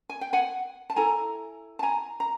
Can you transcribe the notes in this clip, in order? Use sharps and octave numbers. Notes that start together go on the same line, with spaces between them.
G#5
G5
F#5 G#5
A5
E4 A4 G#5 A#5
A5
G#5 A#5
A#5